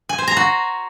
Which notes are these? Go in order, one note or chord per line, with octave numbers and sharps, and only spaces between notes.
G#5
C5
A#5
F#4